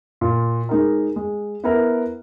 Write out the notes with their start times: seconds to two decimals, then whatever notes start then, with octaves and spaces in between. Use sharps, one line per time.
0.21 A#2
0.69 G#3 D#4 A#4
1.16 G#3
1.64 B3 E4 A#4